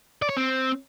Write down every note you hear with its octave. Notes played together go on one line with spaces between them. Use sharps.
D5
C#5
C4